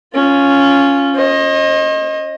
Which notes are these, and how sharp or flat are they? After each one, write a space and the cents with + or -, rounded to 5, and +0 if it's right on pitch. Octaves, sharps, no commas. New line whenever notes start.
C#4 +0 F4 +0
C5 +45 D#5 +0